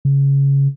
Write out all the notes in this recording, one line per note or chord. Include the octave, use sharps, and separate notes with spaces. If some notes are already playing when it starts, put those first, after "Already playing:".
C#3